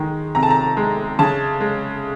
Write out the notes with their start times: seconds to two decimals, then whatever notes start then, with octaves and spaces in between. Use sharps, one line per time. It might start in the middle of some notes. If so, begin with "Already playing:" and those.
Already playing: D#3 G#3
0.35 C3 A#5
0.43 A5
0.50 A#5
0.77 G#3
1.19 C#3 A5
1.60 G#3